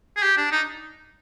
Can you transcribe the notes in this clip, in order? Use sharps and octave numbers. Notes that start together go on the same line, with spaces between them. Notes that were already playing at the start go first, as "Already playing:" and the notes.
G#4
G4
D4
D#4